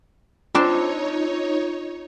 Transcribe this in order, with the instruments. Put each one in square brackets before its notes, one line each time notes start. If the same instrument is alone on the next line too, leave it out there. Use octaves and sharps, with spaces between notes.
[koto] C4 D4 C5 [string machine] D#4 C#5 [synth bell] F4